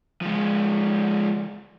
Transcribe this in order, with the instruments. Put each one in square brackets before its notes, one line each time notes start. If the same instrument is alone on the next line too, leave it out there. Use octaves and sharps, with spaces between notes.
[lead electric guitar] F3 G#3